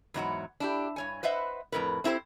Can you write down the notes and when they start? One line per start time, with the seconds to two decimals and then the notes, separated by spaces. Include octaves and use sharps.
0.14 E2 G#2 F#3 F#5
0.60 D4 E4 G4
0.96 G2 C#5 G#5
1.23 B4 C5 D#5 E5 F#5
1.72 F2 A2 E3 A#4 B4
2.04 C4 E4 G4 A#4 C5